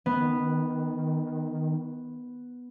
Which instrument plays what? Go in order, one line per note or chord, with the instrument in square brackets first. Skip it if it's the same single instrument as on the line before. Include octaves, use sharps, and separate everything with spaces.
[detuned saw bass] D#3 [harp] B3